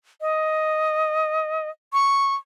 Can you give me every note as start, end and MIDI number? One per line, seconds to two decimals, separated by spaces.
0.21 1.69 75
1.93 2.35 85